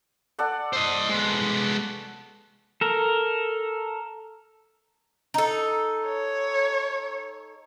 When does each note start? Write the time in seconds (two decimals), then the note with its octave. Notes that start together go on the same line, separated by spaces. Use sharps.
0.39 A4 D5 F#5
0.73 C5 D#5
1.09 G#3 B3
2.81 A4 A#4
5.34 D#4 A4
6.06 C#5